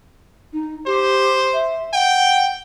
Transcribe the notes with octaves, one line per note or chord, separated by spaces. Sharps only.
D#4
G4 C5
E5
F#5 G5